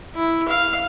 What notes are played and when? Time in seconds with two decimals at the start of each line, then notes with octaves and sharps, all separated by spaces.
0.15 E4
0.48 F5